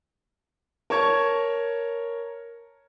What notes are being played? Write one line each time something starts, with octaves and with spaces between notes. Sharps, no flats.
A#4 C#5 A5 C#6 G#6